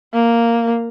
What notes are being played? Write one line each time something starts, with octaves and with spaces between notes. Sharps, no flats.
A#3